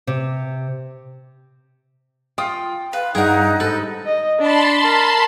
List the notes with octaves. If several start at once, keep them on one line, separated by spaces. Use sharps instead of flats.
C3
F4 G5 D#6
B4 F5
G2 D#4 G#4 A#4 F#5
G#2 G4 A4 B4
D#5
D4 A5 B5 C6
A#4